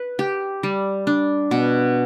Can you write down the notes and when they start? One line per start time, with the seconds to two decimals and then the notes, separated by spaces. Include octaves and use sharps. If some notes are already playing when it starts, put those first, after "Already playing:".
Already playing: B4
0.19 G4
0.63 G3
1.07 D4
1.51 B2